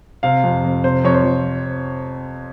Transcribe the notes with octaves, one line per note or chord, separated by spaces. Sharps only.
C3 F5
F2
F2
C3 C5
F2 C#5
C5
F2